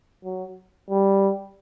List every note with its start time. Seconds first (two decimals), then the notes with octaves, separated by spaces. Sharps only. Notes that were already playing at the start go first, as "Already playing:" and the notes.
0.24 F#3
0.91 G3